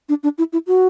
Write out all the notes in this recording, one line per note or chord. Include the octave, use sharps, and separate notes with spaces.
D4
D4
E4
E4
F#4